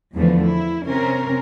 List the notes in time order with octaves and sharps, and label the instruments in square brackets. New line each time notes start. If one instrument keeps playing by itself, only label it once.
[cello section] E2 D3 F3 A3 B3
E4
C3 C4 C#4 A#4